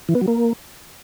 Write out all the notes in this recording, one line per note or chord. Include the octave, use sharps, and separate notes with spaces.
E3
B3
F#3
A#3